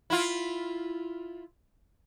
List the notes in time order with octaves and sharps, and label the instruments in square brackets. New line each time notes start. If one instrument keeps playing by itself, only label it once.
[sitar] E4 F4